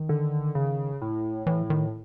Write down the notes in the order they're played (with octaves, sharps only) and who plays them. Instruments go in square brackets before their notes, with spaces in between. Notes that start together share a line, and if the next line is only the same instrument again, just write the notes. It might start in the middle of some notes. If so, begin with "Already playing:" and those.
Already playing: [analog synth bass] D#3
[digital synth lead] D3
C#3
A2
[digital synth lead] A2 [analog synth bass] E3
[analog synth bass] D#3